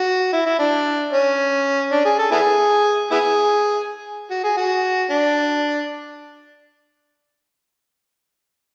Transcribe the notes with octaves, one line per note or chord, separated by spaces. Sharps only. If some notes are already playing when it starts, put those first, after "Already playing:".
Already playing: F#4
E4
E4
D4
C#4
D4
G#4
A4
B3 E4 G#4
B3 E4 G#4
F#4
G#4
F#4
D4